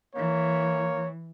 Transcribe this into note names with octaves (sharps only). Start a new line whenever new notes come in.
E3 A#3 C#5